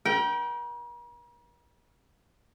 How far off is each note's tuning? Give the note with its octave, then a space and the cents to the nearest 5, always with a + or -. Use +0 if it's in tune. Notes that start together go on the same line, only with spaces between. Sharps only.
A#4 +45 G5 -15